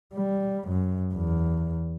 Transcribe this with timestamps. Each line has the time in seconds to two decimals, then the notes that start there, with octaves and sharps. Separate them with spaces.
0.14 G3
0.68 F#2
1.14 E2